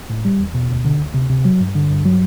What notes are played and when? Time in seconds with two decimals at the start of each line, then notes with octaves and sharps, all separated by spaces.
0.10 A2
0.25 G3
0.40 E2
0.54 B2
0.69 D2
0.85 D3
0.99 D2
1.14 C3
1.29 C3
1.45 F#3
1.60 G2
1.75 D3
1.90 G2
2.06 F#3